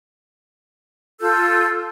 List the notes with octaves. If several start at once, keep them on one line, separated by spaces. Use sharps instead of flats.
F4 A4 E6 G6